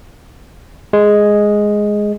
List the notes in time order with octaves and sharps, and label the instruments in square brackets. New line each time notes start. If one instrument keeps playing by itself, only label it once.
[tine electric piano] G#3